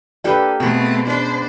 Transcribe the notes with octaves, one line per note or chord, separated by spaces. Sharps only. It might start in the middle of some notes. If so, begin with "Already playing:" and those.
A#3 D4 G4 A4 B4
B2 A3 B3 C4 G#4
G#3 C#4 D4 B4 C5